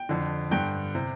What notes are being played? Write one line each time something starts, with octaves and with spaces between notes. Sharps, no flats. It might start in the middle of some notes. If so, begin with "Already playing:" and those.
Already playing: G5
F2 D3
G2 D3 G5
C3